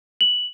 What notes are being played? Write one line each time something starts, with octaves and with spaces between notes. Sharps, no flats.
F#7